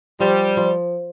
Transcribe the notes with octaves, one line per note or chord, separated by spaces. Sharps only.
F3 G3
F3